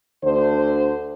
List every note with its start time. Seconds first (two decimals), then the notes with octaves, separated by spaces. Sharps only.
0.24 D2 D3 C5